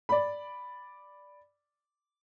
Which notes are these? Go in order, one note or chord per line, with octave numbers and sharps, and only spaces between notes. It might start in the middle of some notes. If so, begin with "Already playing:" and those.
D5 B5